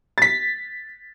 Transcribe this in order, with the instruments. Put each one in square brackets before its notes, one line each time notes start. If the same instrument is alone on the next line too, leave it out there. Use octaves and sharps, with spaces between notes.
[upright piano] A6 B6